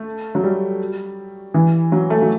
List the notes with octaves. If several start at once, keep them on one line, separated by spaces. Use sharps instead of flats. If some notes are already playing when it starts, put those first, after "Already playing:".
Already playing: A3
F#3
G3
E3
F#3
A3
F#3